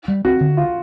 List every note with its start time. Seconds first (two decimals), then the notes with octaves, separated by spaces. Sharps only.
0.08 G3
0.25 C4 F#4
0.41 D3
0.57 F4